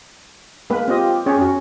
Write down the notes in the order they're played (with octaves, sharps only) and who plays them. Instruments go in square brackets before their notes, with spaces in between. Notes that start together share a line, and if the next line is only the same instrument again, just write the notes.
[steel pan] G#3 A#3 B4
[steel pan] C4 D#5 [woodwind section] F4 G4
[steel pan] C#4 C#5 [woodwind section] G4 G#4
[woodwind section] F#2 [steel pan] C#4 F#4